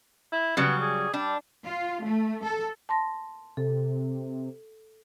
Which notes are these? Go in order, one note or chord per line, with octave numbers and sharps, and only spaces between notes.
E4
C#3 F#3 G3 B3
G#4
G3 D4
F4
A3
A4
A5 C6 A#6
C3 A4